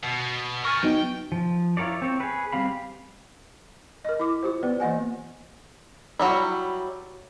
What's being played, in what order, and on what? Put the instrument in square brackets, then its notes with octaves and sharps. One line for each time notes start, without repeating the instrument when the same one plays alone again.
[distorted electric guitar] B2
[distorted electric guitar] A#4 G#5 [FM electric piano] C#6 F6 A6
[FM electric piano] F#3 B3 D#4 [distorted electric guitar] G5
[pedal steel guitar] F3
E4 F4 A#4 C#5 D5
C4 C#5
G#4 B4
G3 C4 F5 B5
[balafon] A#4 D#5
E4 D6
F4 G4 C5
B3 B4 D5
E3 A#3 D#5 F#5 G#5
[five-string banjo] F#3 G3 E4